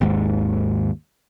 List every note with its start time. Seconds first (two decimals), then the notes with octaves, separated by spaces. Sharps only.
0.01 G#1 D#2 G#2